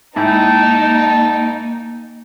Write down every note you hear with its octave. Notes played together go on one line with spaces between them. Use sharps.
G#2 A#3 D#4 E4 G5 A5